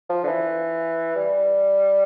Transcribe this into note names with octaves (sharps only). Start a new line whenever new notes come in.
F3
D3
E3
G3